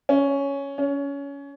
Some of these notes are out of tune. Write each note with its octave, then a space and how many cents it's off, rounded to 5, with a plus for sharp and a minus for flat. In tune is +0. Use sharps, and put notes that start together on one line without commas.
C#4 +5
C#4 +20